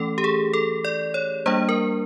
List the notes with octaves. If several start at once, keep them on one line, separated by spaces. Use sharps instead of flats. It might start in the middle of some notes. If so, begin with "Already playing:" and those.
Already playing: E3 A3 C#4 A4
G4
G#4
A4
D5
C#5
G3 A#3 D4 C5
A#4